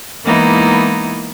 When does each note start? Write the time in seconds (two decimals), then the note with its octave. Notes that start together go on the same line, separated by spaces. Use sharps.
0.25 E3 G#3 A#3 B3 D#4 E4